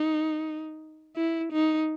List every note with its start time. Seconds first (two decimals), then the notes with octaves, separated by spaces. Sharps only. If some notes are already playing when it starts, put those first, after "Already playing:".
Already playing: D#4
1.16 E4
1.52 D#4